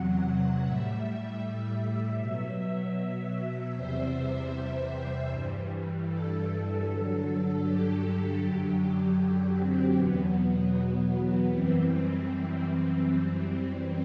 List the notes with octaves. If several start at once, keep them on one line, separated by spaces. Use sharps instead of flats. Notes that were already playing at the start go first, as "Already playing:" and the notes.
Already playing: E2 C3 F#3 F#5
A2 G3 E5
B2 F#3
E2 C3 G3 C5
G2 E3 G3
A4
G2 D3 F#3
G4
F#2 D3 F#3
C4
E2 B2 F#3 B3
F#2 E3 G3 C4